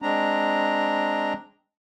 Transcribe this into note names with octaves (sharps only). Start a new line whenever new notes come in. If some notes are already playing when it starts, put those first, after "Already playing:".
G#3 C4 D4 A#5